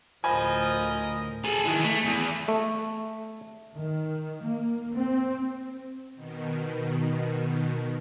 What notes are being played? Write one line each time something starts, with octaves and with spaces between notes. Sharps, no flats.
D2 A2 F3 A#4 D#5 G#5 B5
G#4 A4
D#3 E3
A3
E2
A3
D#3
A#3
C4
B2 D#3